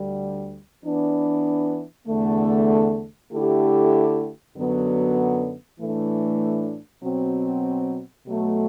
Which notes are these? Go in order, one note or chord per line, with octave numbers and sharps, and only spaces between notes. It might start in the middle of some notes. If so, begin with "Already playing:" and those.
Already playing: D2 D3 G3
E3 B3 D4
E2 D3 A3
D3 A3 E4 G4
F#2 D3 F#3 B3
A2 E3 A3 D4
B2 F#3 C4
B2 F#3 A3